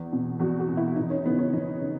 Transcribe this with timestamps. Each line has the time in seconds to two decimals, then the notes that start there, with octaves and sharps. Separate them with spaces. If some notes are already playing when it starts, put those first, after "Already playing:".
Already playing: E2
0.12 B2
0.40 E2 F#4
0.60 F#4
0.68 B2
0.77 E4
0.96 E2 D#4
1.10 C#4
1.25 C#3 E3 B3
1.38 C#4
1.53 E2 D#4
1.81 C#3